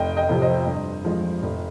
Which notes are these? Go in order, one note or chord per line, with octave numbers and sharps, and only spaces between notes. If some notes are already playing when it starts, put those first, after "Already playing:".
Already playing: F1 D#5 G5
D#5 G5
F2 C3 F3
C5 D#5
G2
F3 G#3
F1